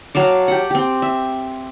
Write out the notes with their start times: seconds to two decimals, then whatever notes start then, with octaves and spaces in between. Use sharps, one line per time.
0.15 F#3 F5 A5 D6
0.48 G4 F#5
0.71 C4 G4
1.02 E5